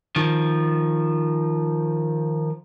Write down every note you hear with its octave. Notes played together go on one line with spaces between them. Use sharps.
D#3 F3